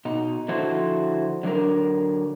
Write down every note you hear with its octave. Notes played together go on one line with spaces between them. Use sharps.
B2 D#4
D3 F3 E4 F#4 A4 C5
D3 F#3 D4 A#4